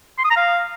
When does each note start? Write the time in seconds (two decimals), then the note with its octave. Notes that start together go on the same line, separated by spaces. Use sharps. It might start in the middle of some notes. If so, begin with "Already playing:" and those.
0.18 C6
0.24 D#6
0.30 A#5
0.36 F5